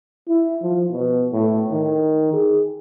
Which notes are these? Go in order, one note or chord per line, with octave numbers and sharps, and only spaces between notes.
E4
F3
B2
A2
D#3
G#4